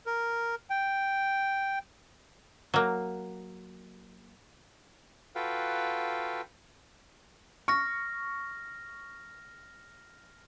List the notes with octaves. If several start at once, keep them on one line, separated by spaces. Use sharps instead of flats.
A#4
G5
F#3 A#3
F4 F#4 A4 B4 F5 G5
C#6 F6 A#6